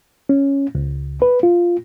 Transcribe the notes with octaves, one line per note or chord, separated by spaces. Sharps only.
C#4
C#2
B4
F4